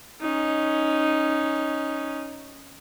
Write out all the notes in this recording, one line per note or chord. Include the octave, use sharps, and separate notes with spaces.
C#4 D#4